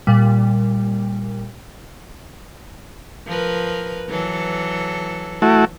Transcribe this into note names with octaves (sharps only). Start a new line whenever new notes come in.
A#2 G3
F3 A#4 B4
E3 F#3 A4
A3 E4 F#4